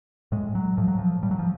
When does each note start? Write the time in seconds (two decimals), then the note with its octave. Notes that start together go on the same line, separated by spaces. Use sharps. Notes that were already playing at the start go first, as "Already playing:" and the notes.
0.32 A2 G#3
0.55 F#3
0.77 A2 F3
0.88 F#3
0.99 F3
1.23 A2 G3
1.31 F#3
1.39 F3